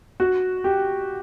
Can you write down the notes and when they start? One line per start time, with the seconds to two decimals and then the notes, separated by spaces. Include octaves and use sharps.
0.20 F#4
0.64 G4